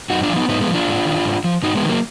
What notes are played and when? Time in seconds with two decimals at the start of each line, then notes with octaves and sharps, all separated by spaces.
0.10 F#2 D#4 F#4
0.23 D4 F4
0.30 F3
0.36 B3 D#4
0.48 G#2 B3 D#4
0.61 G#3 B3
0.67 F3
0.74 D4 F4
0.87 G#2
1.06 D#3
1.25 G#2
1.44 F3
1.63 G#2 D#4 F#4
1.76 G#3 B3
1.82 D#3
1.89 F#3 A#3